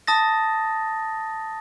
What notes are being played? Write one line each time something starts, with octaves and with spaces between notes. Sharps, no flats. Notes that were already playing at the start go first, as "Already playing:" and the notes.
A5 D#6 A6 A#6